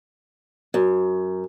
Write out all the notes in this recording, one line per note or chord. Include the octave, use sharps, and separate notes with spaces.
F#2